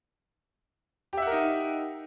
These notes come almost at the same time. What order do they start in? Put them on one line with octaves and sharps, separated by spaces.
G4 E5 F#5 A#4 D#4